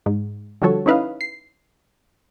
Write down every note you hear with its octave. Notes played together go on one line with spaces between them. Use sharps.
G#2
D3 F3 G3 F#4 A4 C#5
C#4 D#4 E4 B4 D#5 F5
C7